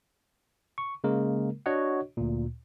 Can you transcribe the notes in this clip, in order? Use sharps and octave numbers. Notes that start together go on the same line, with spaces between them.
C#6
C#3 G#3 A#3 A#4
D4 F#4 C#5 D#5 F#5
D2 A#2